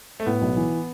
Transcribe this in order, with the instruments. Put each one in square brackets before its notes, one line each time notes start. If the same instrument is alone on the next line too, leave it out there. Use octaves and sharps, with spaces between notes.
[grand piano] A3
[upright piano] A2 [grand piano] B3
[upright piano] B1
E3